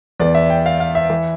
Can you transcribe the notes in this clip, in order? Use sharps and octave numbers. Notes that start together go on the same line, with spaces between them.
E2 E3 D5
E5
G5
F5
F5
E5
E3